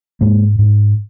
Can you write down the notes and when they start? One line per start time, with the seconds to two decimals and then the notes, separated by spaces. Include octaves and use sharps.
0.21 G#2 G#3 A#3
0.59 G#2